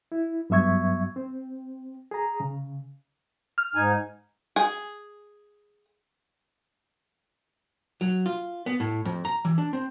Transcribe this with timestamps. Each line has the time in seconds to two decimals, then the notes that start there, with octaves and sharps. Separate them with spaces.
0.12 E4
0.50 G2 F#3 B3 E5 C#6 G#6
1.16 C4
2.11 G#4 A#5
2.40 C#3
3.58 F6
3.75 G#2 D#4 G#5
4.56 G#4
8.01 F#3
8.26 F4
8.66 B3
8.80 A2
9.05 F2
9.25 A#5
9.45 E3
9.58 D4
9.73 C4